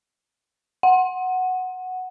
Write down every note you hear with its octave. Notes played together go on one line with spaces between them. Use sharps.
F#5